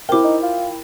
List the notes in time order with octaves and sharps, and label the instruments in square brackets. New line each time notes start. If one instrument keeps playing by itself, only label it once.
[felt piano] E4 C5 G5 [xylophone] A#4 D6
[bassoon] D#4
F4